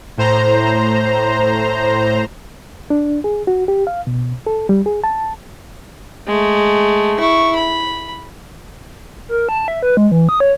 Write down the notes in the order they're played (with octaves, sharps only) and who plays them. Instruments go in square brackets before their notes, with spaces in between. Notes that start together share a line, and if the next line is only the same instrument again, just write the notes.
[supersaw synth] A2 C5 A#5
[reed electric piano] D4
G#4
F#4
G4
F5
B2
A4
G3
G#4
A5
[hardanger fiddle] G#3 A3
E4 C#6
B5
[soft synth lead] A#4
A5
E5
B4
G#3
E3
D#6
C#5